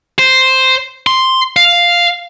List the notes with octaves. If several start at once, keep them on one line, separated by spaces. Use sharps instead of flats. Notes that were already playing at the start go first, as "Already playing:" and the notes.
C5
C6
F5